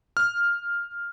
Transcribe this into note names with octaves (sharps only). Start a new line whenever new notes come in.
F6